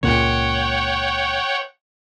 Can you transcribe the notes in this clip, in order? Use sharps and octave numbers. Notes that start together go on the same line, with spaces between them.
C#2 A#2 C#5 F#5 G5